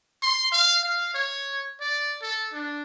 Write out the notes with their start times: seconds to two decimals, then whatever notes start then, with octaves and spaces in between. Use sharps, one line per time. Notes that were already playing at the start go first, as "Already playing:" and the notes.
0.23 C6
0.52 F5
0.83 F5
1.14 C#5
1.81 D5
2.22 A4
2.53 D4